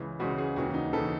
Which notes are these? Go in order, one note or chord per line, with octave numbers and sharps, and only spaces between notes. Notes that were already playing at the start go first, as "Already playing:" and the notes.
Already playing: C#2 C#3 E3
C#2 C#3 E3 F#4
G#4
D#2 C#3 E3 F#4
D#4
C#3 E3 A4